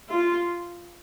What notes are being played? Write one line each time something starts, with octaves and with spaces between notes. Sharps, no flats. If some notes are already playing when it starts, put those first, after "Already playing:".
F4